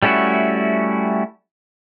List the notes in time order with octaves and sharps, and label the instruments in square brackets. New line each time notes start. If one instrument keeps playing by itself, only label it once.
[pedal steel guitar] G3 A3 C#4 E4 F#4